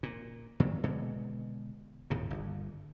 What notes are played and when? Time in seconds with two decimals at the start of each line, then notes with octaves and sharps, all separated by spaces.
0.03 A#2
0.60 A#2 D#3 F#3
0.84 B2 D3 G#3
2.10 D1 D#2 G#2 C3
2.30 G1